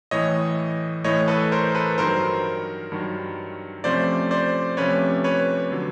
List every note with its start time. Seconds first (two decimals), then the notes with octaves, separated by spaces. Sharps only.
0.11 A2 E3 A3 C#5 D#5
1.04 A2 E3 A3 C#5 D#5
1.28 A4 B4
1.52 A#4 C5
1.75 A4 B4
1.98 G2 D#3 F#3 A#4 C5
2.92 G2 D#3 F#3
3.84 C3 F3 A3 C#4 C5 D5
4.31 C5 D5
4.77 C3 F3 A3 C#4 B4 C#5
5.24 B4 C#5
5.72 D3 F#3